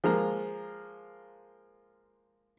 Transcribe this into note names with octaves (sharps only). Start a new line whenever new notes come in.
F3 G#3 A#3 A#5